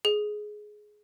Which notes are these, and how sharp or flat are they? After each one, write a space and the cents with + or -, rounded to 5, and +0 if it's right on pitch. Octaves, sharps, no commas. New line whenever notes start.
G#4 +15